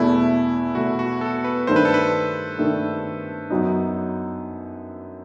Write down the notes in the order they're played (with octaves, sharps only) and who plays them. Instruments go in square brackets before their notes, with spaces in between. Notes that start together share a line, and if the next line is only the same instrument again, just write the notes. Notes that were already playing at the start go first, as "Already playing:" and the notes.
Already playing: [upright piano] E2 B2 A3 [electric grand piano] E4
[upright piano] E2 B2 A3 [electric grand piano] F#4
[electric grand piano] F#4
A4
B4
[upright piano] G2 D#3 A3 [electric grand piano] C5
[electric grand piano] B4
A4
B4
[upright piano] G2 D#3 A3
F#2 F#3 B3 D#4